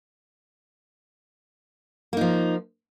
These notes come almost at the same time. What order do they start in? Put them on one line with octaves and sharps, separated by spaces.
A#3 D#4 F3